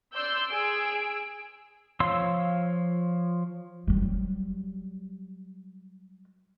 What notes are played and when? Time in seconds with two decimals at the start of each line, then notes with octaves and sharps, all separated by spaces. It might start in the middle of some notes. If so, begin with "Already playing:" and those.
0.14 D5 C6 E6 G6
0.50 G#4 E6 D7
2.00 F3 C#5 F5 C6 E6
3.87 F#3 G3